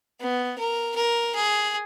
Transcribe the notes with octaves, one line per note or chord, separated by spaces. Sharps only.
B3
A#4
A#4
G#4